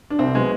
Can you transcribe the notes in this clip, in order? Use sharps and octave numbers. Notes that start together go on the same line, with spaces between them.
D4
C2 C4
B2 G#3